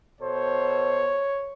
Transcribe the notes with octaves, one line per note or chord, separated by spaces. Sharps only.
B2 A4 C5 C#5